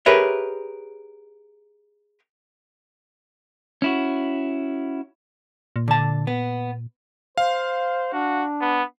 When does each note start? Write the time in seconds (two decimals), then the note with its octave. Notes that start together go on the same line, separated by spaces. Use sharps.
0.06 G4 G#4 A#4 B4 C#5 E5
3.82 C#4 E4 F#4
5.76 A#2
5.88 D3 A5
6.27 B3
7.37 C5 F5
8.13 D4 F#4
8.61 B3